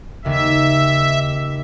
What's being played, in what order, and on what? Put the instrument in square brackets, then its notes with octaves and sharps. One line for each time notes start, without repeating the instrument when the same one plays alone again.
[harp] D#2 C#3 [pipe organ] E5